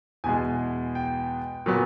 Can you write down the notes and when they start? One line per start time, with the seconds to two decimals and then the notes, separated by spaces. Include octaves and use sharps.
0.24 E2 B2 G#3 G#5
0.95 G5
1.66 A#2 F#3 B3